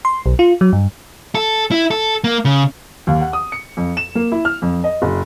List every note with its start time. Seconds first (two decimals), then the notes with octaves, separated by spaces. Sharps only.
0.05 C6
0.26 B1
0.39 F4
0.61 F#3
0.73 G2
1.35 A4
1.71 E4
1.91 A4
2.24 A#3
2.45 C#3
3.07 D#2
3.21 F#5
3.33 D#6
3.52 C#7
3.77 F2
3.97 E7
4.15 A#3
4.32 E4
4.45 F6
4.62 F2
4.84 D#5
5.02 F#1